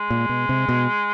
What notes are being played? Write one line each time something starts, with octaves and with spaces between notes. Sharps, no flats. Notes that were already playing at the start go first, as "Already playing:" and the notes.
Already playing: G#3
A#2
B2
C3
B2